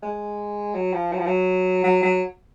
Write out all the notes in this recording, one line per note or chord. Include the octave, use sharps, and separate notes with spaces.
G#3
F#3
F3
F#3
F3
F#3
F#3
F#3